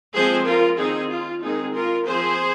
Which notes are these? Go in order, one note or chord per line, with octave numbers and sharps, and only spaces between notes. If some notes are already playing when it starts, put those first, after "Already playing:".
F3 G#3 C4 G#4 C5
F4 A#4
D#3 C4 D#4 G#4
F4
D#3 G#3 C4 D#4 G#4
F4 A#4
F3 C4 G#4 C5